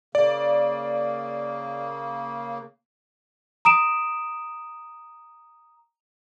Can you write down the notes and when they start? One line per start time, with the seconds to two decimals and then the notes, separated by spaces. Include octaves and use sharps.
0.15 C#3 A#3 D5
3.65 A#5 D#6 D7 E7